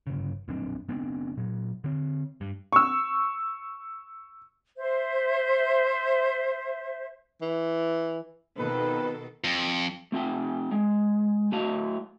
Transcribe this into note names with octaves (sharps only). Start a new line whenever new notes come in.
G1 C#3
A#1 F#2 C4 D4
F#1 B3 C4 D4
A#2 F#3
D3 C4
G2
C#6 E6
C5 E5
E3
F2 B2 D#3 A4 B4
F2
A3 C4 F4 G5
G#3
A2 A3 F#4 D#5 F5